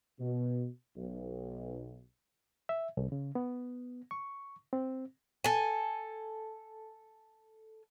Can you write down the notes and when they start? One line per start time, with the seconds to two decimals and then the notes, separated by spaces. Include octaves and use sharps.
0.20 B2
0.97 B1
2.69 E5
2.97 C2
3.12 C#3
3.35 B3
4.11 C#6
4.73 C4
5.44 A4 G#5